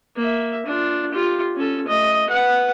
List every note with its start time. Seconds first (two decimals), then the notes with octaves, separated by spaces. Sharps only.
0.16 A#3 E5
0.66 D4 F4
1.12 F4 G4
1.56 C#4 A4
1.87 A3 D#5
2.29 B4 F#5